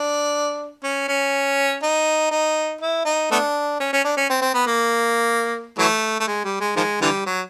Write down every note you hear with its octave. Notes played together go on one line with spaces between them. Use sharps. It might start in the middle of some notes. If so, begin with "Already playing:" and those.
Already playing: D4
C#4
C#4
D#4
D#4
E4
D#4
A3 B3 D4
C#4
C#4
D4
C#4
C4
C4
B3
A#3
E3 F#3 A3
A3
G#3
G3
G#3
D#3 F3 G#3
D3 E3 G3
F#3